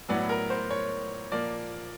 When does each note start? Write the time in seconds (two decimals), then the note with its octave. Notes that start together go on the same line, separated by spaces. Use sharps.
0.09 A2 F#3 B3 D5
0.29 A#4
0.50 C5
0.70 C#5
1.32 A#2 F3 A#3 D5